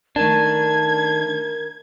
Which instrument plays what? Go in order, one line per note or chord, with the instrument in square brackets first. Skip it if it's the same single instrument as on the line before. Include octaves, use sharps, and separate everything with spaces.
[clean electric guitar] D#3 D4 [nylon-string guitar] A3 A5 [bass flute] A#4 [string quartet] G#6